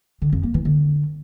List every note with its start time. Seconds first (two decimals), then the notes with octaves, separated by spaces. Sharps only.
0.22 D3
0.32 F2
0.43 A#3
0.54 E3
0.65 D3